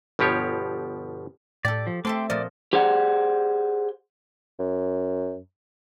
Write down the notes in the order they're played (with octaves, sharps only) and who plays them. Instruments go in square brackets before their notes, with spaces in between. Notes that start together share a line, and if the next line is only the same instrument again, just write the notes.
[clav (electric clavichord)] G1 B2 F3 G4 C#5
[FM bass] A2 [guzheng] G4 A4 [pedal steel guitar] D5
[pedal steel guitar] F3
[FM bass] A3 [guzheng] C4 A4 E5 [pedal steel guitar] G5 C6 D6
[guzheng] A#2 F3 D#5 [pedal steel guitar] D5
[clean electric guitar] G4 G#4 C5 D5 F#5
[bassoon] F#2